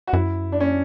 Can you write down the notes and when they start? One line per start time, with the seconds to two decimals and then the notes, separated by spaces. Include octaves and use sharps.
0.07 F#4
0.13 F#2 E4
0.52 D4
0.60 C#4